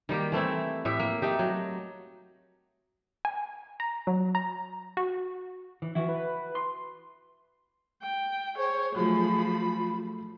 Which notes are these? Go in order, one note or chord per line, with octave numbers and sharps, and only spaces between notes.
D#3 G3 A#3 G4
E3 A3 C4 E4
A2 G4 E5
A#3
A3 D#4 G4
F#3
G#5
A#5
F#3
A#5
F#4
E3
E3 E4 F#4
B4
C6
G5
G#4 C5 C#5
F3 F#3 A3 B5